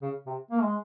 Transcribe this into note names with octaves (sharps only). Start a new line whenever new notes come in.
C#3
C3
A#3
G#3